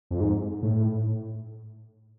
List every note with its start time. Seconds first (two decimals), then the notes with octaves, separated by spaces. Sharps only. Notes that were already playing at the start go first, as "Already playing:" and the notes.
0.11 F2
0.20 G#2
0.62 A2